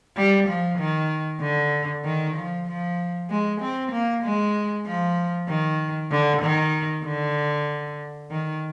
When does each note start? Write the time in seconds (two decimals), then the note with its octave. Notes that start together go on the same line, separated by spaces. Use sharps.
0.17 G3
0.48 F3
0.79 D#3
1.41 D3
2.05 D#3
2.36 F3
2.66 F3
3.30 G#3
3.61 C4
3.92 A#3
4.23 G#3
4.85 F3
5.48 D#3
6.11 D3
6.42 D#3
7.05 D3
8.30 D#3